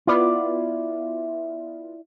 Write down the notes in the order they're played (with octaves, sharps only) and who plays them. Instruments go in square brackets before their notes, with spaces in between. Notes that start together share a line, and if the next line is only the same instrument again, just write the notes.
[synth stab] B3 F4 [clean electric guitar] E4 D5